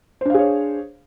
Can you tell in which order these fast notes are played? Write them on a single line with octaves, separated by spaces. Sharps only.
C5 D4 F5 G#4 C#5